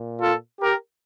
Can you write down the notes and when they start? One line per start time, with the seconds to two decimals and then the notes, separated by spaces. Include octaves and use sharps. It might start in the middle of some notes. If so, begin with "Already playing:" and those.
Already playing: A#2
0.21 F4 A4
0.61 G4 A#4